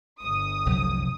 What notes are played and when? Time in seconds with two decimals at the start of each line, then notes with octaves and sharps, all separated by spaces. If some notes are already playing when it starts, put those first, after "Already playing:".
0.20 G1 D#6
0.66 F1 C2 F#3